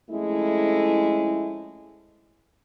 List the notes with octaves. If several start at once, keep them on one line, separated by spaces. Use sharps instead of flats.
F2 G#3 A3 C#4 E4